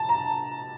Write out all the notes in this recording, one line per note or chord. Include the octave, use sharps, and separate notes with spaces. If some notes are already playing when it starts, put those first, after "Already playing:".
Already playing: A5
A#5